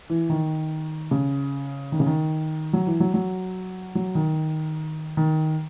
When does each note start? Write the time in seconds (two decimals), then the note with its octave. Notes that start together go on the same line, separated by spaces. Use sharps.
0.10 E3
0.30 D#3
1.11 C#3
1.92 D#3
2.00 C#3
2.06 D#3
2.73 F#3
2.87 E3
3.00 F#3
3.14 F#3
3.95 F#3
4.15 D#3
5.17 D#3